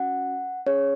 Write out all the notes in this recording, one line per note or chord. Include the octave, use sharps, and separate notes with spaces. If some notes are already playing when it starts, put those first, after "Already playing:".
Already playing: C#4 F#4 F#5
C#4 G#4 C#5